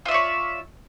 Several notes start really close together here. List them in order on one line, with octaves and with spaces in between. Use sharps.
F4 E5 D5 C#5